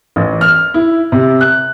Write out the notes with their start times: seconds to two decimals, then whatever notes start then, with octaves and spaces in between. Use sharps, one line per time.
0.16 A1
0.41 F6
0.74 E4
1.12 C3
1.41 F#6